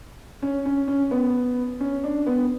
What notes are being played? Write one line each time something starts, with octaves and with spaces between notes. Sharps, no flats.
C#4
C#4
C#4
B3
C#4
D4
B3